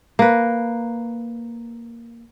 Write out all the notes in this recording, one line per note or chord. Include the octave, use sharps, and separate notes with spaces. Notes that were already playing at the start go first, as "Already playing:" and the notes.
A#3 B4